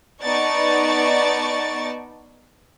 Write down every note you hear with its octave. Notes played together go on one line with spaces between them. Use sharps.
B3 D#4 D5 A5 C#6 A6